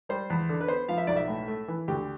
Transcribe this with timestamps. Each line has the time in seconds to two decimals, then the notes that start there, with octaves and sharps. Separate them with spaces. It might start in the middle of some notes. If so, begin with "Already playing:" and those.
0.09 G3 C5
0.30 E2
0.49 D3
0.61 B4
0.68 B3 C5
0.88 F3 F5
0.98 E5
1.07 B1 D5
1.17 E5
1.28 A2
1.48 A3
1.68 E3
1.88 D2 G4